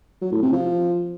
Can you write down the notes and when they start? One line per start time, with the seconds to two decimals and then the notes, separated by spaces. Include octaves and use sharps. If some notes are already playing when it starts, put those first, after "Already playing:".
0.22 F#3
0.32 A2
0.42 C3
0.53 F3